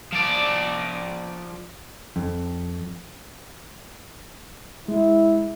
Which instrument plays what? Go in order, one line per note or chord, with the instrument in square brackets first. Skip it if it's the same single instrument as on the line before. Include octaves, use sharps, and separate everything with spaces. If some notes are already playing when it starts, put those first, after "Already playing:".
[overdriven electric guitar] F3 D5
[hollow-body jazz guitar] F2
[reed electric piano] G#3 [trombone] E4